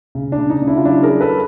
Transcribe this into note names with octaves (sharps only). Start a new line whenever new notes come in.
C#3
D4
C#3
D#4
C#3
D4 E4
F4
F#3 D4 E4
G#4 A#4
F#3
A4 B4